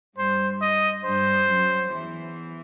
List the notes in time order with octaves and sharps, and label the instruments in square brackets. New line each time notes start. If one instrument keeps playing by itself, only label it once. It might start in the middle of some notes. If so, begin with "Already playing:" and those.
[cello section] G2 G3 [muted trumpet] C5
[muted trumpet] D#5
[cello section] G2 G3 [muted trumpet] C5
[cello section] F#2 F#3
E2 E3